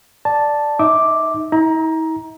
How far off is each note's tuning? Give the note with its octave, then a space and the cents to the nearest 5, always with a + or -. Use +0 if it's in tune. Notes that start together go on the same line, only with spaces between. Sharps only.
D5 +0 A5 +0
D#4 +0 E5 -30 D6 +0
E4 -45 A#5 +15